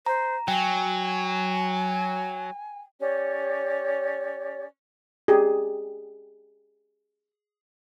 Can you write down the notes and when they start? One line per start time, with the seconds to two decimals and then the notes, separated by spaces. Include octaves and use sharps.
0.06 C5 A#5
0.48 F#3 G5 G#5
3.00 C#4 G4 C#5 D5
5.28 G4 G#4